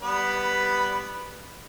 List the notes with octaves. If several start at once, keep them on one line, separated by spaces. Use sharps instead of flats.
G3 B3 B4